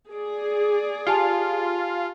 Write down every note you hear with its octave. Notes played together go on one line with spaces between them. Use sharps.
G#4 D5
F4 G4 G#5 A5